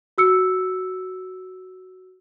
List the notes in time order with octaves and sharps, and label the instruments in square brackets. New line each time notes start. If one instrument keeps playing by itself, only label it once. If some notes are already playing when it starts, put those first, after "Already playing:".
[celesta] F#4 E6 C#7